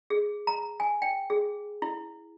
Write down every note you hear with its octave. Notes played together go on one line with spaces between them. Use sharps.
G#4
A#5
G#5
G5
G#4
E4